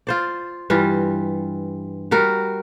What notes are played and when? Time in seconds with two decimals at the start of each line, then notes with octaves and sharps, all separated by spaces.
0.07 F4 C5 D5
0.70 G2 E3 G3 F4
2.11 G3 F#4 A#4